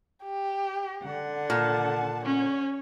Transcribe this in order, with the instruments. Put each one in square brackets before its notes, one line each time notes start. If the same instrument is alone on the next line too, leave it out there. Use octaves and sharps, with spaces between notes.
[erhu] G4
[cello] D3 F#5
[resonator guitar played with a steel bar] A#2 [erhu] A5
[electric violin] C#4 [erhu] C#5